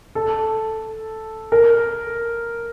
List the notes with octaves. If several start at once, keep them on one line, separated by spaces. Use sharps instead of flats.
A4
A#4